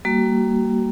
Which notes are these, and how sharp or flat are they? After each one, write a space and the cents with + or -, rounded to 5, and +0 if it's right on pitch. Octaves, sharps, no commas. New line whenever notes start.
G3 +0 A#3 -5 F#4 +25